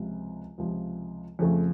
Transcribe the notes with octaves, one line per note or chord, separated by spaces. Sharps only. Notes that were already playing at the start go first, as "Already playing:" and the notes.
Already playing: C#2 C3 F3
C#2 C3 F3
F2 C#3 F3 A3